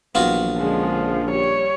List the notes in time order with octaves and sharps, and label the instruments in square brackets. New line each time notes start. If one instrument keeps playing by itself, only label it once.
[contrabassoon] A#1 [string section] E3 F#3 [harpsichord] B3 F4 F#4
[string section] D3 G#3 C#4 [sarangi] F3
[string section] G3 [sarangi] C#5